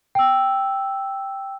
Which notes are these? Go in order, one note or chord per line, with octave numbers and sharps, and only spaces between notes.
G5 E6